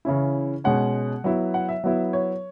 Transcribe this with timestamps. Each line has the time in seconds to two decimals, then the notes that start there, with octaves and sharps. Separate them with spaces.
0.05 C#3 E3 C#4 E4
0.64 B2 G#3 C#4 F#5
1.24 F#3 B3 E4
1.54 F#5
1.69 E5
1.84 F#3 B3 E4
2.13 C#5